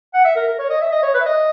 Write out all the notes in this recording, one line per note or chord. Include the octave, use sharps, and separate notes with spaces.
F#5
E5
A#4
A#4
C#5
D#5
E5
D#5
C#5
B4
E5
D#5